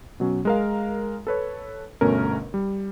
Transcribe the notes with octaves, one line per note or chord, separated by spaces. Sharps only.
B2 F#3 C#4
G#3 A#4 F5
A4 B4 C#5
G1 B2 A3 C#4 A#4
G3